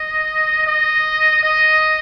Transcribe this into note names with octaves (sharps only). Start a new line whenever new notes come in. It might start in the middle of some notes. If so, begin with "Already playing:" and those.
Already playing: D#5
D#5
D#5